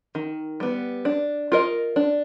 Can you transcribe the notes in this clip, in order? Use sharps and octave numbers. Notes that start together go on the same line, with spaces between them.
D#3
G3 B3
D4
F4 A#4 D#5
D4